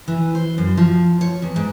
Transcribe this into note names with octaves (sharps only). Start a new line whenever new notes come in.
E3
C5
F#2
F3
C#5
E2
G#2